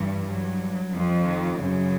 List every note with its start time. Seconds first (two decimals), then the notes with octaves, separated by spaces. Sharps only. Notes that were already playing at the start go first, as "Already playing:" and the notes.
Already playing: G2 E3
0.29 F#3
0.94 F2 F3
1.27 D#3
1.60 F#2 C#3